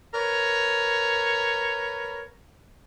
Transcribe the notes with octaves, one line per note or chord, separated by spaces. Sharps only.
A#4 B4 C#5